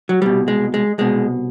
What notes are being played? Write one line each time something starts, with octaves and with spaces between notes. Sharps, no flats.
F#3
C2 B2 G3
G#3
G#3
C2 B2 G#3